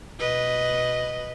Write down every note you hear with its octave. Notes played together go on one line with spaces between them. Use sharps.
B2 B4 D#5